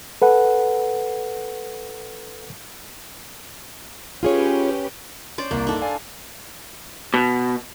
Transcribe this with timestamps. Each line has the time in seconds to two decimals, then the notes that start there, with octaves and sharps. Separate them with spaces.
0.22 A4 B4 F#5
4.23 C#4 F4 G4 G#4 B4 C#5
5.38 C#4 C5 D5
5.51 C2 A#3
5.67 G2 D4 D#4 A4
5.81 D5 F5 G#5
7.14 B2